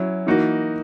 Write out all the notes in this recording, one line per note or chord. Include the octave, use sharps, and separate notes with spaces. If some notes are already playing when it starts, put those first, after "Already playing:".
Already playing: F#3 C#4 E4
E3 A#3 D#4 F#4